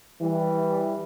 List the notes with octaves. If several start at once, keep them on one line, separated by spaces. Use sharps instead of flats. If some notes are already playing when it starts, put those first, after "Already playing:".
E3 G3